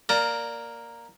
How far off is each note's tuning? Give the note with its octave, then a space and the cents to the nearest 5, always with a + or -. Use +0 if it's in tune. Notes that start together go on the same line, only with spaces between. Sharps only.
A#3 +0 D5 +0 A#5 -20